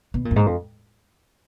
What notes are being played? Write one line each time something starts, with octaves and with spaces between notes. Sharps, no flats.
B2
A#2
F#2
G#2
F2